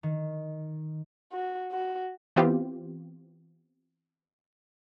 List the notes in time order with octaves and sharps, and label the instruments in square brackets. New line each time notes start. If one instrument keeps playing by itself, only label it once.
[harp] D#3
[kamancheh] F#4
F#4
[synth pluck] E3 B3 C4 F4 G4